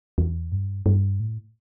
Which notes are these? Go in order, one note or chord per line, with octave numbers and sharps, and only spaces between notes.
E2
G2
G2
A2